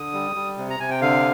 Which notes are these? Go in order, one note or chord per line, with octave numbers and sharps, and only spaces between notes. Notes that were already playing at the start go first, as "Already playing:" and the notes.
Already playing: D3 D#6
G3
G3
C3
A#5
C3 G#5
G5
D3 F5